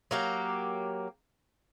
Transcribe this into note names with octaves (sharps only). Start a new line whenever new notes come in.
F#3 A#3 G4